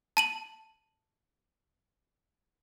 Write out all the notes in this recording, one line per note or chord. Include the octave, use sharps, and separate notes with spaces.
A5 D#7 F#7